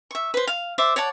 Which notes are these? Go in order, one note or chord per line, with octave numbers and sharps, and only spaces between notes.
E5 C#6
B4 C5
F5
C5 D5 E5 D6
C#5 D5 F#5 A5